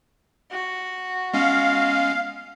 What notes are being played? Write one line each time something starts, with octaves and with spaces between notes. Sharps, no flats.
F#4
G#3 B3 C#4 F5